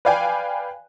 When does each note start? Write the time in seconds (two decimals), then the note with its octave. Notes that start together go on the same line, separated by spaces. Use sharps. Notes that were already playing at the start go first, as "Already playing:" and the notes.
0.05 B4 D5 F5 G5 G#5